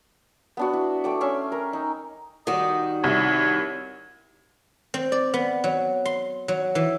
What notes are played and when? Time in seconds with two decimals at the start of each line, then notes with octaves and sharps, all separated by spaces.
0.57 B3 D4 F#4
0.73 E4
1.04 A3 G5 D6
1.21 C#4 E5 C6
1.52 A#4
1.73 D#4
2.47 D#3 G3 F#4 D#5
3.04 C2 C#5
4.94 C4
5.12 D5
5.34 B3
5.64 F#3
6.05 C6
6.48 F#3
6.75 E3